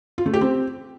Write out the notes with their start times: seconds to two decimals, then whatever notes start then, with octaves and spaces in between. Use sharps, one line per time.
0.18 F4
0.26 A3
0.33 G4
0.41 C4